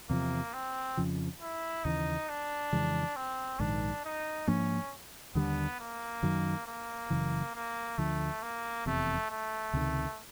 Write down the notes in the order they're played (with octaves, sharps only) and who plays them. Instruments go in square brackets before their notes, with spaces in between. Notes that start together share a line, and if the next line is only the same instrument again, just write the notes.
[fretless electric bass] E2 C3 F3 [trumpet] A#3
[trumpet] C4
[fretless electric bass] F2 C#3 F3
[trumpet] E4
[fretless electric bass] D#2 C#3 E3 [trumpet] D#4
[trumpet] D4
[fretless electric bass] F2 C#3 E3 G#3
[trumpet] C4
[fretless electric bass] A#1 G#2 D#3 [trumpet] D4
[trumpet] D#4
[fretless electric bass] G#2 F3 A#3 D4 [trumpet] C#4
[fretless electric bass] D#2 D3 G3 [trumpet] B3
[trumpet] A#3
[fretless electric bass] F#2 D#3 F#3
[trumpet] A#3
[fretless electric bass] F#1 F#2 C#3 E3
[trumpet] A#3
[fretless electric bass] D2 D3 F3 [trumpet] A3
[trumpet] A#3
[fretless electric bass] F1 E2 C3 [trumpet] A3
[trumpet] A3
[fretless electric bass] C#2 C3 D#3